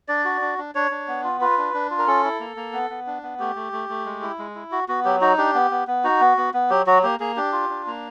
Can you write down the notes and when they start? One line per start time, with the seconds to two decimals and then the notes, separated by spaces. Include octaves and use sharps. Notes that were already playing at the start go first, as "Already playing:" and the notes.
0.08 D4 D5
0.25 F#4
0.41 D4
0.58 D4
0.75 D4 C#5
0.91 D4
1.08 B3
1.24 F4
1.41 F4 B4
1.58 D4
1.74 D4
1.91 F4
1.98 A#4
2.07 C#4 A4
2.24 E4
2.40 A#3
2.56 A#3
2.73 B3
2.90 B3
3.07 D4
3.23 B3
3.39 A3 G4
3.56 A3
3.73 A3
3.89 A3
4.06 G#3
4.22 E4
4.39 G#3
4.55 E4
4.72 F#4
4.89 B3 F#4
5.05 F#3 G4
5.21 D#4 F#4
5.38 D4 G4
5.54 B3
5.71 B3
5.87 B3
6.04 D#4 F#4
6.21 B3
6.37 B3
6.54 B3
6.70 F#3 G4
6.87 F#3 F#4
7.03 A#3 G4
7.20 A#3 G#4
7.36 D4 G4
7.53 F4
7.69 D4
7.87 A#3